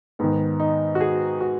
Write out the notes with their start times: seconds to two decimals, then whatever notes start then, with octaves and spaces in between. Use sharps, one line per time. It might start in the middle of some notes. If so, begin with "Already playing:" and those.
0.19 G#2 D#3 B3
0.60 D#4
0.95 F#4
1.01 G#4
1.41 F#4